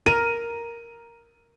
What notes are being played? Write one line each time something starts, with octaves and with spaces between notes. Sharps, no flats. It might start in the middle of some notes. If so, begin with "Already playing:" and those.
A#4 D#7